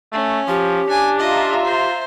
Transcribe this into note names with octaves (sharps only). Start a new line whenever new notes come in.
A3 C#4
F3 G4
D4 G#5
F4 D#5 E5 A#5
C5